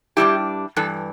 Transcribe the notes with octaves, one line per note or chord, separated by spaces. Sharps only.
G2 E3 G3 D4 E4 G4
G2 E3 A4